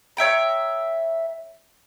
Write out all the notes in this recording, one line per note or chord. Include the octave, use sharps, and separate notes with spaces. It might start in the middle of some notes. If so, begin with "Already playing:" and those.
C#5 E5 G5 A#5